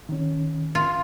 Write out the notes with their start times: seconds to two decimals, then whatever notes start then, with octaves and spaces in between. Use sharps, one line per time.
0.09 D#3 C#4
0.75 F4